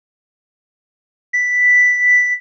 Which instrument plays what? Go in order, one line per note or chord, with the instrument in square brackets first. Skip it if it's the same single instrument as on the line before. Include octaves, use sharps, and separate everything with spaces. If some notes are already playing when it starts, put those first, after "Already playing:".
[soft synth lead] B6